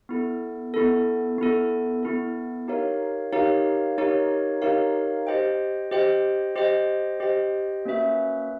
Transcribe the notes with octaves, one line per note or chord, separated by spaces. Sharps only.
B3 E4 A4
B3 E4 A4
B3 E4 A4
B3 E4 A4
D#4 G4 A#4 C#5 F5
D#4 G4 A#4 C#5 F5
D#4 G4 A#4 C#5 F5
D#4 G4 A#4 C#5 F5
G4 C5 D#5 G5
G4 C5 D#5 G5
G4 C5 D#5 G5
G4 C5 D#5 G5
A#3 C#4 F#4 B4 E5